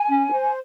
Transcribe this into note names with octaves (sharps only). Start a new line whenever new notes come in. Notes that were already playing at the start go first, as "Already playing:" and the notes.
Already playing: G#5
C#4
C5